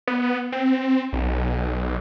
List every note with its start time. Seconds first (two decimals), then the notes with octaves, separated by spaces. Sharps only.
0.07 B3
0.52 C4
1.13 B1